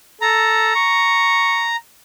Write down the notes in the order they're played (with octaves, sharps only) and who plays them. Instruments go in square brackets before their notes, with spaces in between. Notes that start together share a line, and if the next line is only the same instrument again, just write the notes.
[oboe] A4 [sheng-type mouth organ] A#5
[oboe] C#6